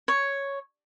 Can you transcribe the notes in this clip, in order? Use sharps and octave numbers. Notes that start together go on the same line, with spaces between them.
C#5